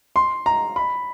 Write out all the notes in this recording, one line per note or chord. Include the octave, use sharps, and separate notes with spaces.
C6
A#5
B5